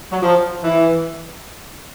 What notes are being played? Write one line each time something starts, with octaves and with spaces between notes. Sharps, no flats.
F#3
F3
E3